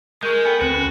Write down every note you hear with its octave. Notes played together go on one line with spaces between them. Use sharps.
G#3 G#4 A#4 C#6 G6
B3 A4 G5 G#5
D2 C4 F#4 B4
C#4